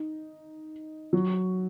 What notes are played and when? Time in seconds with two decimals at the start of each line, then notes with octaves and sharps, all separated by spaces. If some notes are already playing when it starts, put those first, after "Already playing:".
Already playing: D#4
1.13 F#3